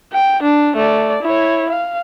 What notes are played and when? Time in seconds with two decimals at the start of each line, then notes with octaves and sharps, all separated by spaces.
0.13 G5
0.43 D4
0.76 A3 D5
1.23 E4 C#5
1.70 F5